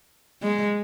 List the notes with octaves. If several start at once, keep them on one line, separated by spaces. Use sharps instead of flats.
G#3